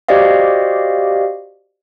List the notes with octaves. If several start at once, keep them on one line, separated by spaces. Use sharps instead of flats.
F#4 G4 C5 D5 D#5 F5